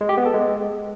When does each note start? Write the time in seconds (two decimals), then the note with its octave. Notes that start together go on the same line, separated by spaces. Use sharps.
0.01 G#3
0.09 G4
0.17 B3
0.26 A4
0.34 G#3